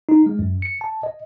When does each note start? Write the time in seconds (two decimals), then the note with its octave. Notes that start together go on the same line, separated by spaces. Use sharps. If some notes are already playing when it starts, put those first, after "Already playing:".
0.09 D#4
0.26 G#3
0.39 F#2
0.62 C#7
0.81 A5
1.03 D#5